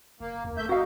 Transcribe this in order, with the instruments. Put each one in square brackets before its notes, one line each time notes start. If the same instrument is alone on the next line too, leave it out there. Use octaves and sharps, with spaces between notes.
[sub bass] F#1 [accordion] A#3
[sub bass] D#2
[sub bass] F1 [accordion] A3 E5 G6
[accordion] D#4 [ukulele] F#4 F5